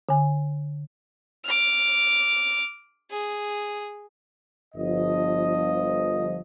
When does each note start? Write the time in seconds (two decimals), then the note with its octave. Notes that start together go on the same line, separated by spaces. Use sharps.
0.09 D3 G#5
1.45 D6 F6
3.11 G#4
4.74 G1 F3 D#5